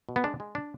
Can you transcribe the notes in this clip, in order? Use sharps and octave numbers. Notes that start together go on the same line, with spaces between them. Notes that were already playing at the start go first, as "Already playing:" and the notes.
B2
B3
G#3 D4
G#3
D4